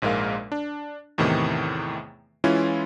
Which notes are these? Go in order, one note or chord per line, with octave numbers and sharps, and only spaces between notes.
A#1 G#2 G#3 A#4 F5
D4
E2 A2 C3 D#3 E3
E3 G#3 C#4 E4 F4